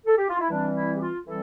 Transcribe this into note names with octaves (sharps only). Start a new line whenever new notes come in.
A4
G4
F4
E4
E3 G3 C4 D4
E4
G4
F4
E3 G3 C4 A4